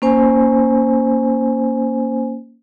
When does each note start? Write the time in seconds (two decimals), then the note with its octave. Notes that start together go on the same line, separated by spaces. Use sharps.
0.02 A#3 C#4 C5 G#5